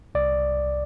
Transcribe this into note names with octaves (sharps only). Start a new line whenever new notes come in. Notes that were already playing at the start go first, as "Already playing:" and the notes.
C2 D5